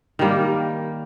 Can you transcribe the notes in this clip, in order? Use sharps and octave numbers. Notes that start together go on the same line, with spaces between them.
D#3 G3 A#3